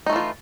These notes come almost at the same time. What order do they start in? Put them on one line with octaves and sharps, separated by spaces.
D#4 A3 E3 F4